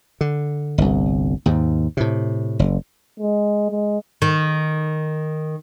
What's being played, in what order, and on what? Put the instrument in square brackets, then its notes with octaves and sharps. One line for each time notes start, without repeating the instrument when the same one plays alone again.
[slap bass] D3
G1 C2
D#2 G#2
A2 C3
F#1
[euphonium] G#3
G#3
[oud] D#3